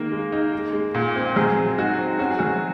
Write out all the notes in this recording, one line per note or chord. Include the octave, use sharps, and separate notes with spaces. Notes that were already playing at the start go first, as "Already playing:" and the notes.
Already playing: D#3 G#3 A#3 A#4
G#3
D#4
G#3
G#3
A#2
C4
F#3 G#3 G#4
C4
D#4 F#4
C4
C#4 F#4
G#4
F#3 F#4